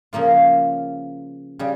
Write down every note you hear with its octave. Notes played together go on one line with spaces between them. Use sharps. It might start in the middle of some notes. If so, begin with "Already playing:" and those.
C#3 F3 A#3 F4
C#3 G3